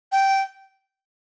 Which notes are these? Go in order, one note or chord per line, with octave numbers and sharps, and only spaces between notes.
G5